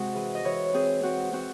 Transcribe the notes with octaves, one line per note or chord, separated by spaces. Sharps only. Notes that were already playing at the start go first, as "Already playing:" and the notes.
Already playing: C3 G#3 C4 F#4 C5
E3 G#4
D#5
E3 C#5
C4 G#4
C4 F#4
C4 F#4